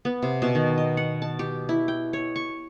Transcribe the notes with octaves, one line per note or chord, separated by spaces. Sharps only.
B3
C3
B2
D#3
D#5
F#5
A5
G4
E4
G5
C#5
C#6